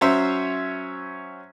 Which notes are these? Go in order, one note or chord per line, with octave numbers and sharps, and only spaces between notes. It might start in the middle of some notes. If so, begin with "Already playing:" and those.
F#3 C#4 C5 E5